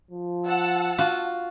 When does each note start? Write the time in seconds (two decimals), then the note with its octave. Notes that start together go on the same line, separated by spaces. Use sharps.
0.11 F3
0.45 F#5 A5 E6
0.98 F4 F#4